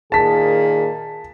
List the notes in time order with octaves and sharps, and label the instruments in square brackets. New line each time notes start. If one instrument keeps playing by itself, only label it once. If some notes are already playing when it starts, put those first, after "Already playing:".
[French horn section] A#2 D#3 G#4 [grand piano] A5 B6